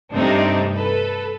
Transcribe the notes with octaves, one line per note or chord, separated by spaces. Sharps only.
G2 C3 A3 C4 D4 D#4
A4 B4